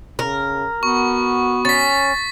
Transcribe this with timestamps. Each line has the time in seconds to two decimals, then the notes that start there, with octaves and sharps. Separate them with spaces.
0.19 C#3 A#4
0.83 B3 F#4 C#6
1.65 C#4 A6 B6